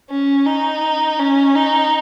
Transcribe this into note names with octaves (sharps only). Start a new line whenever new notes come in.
C#4
D#4
C#4
D#4